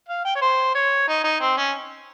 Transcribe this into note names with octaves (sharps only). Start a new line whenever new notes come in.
F5
G5
C#5
C5
C#5
D#4
D#4
C4
C#4